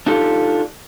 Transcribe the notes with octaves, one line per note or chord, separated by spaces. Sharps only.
D4 D#4 F4 G4 A4